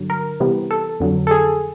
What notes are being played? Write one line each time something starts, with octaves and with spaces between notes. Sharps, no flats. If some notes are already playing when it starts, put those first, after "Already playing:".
Already playing: G2 D3 F#3
A#4
C3 E3 G3 B3
A4
F2 D3 F#3
A4
G#4